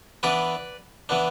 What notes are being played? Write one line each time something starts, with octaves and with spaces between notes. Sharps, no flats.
E3 B3 D4 B4 D5
E3 B3 D4